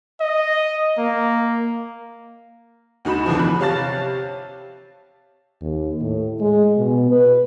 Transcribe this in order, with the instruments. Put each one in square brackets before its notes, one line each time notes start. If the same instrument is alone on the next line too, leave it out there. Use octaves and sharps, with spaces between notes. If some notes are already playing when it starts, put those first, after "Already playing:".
[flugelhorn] D#5
A#3
[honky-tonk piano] D2 D#4 F#4 B5 E7
E2 D3 E3 F3
B5 F#6
C3 C#5 F5 A5 A6
[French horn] D#2
A2
G#3
B2
B4